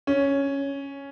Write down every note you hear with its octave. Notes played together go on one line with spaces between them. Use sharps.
C#4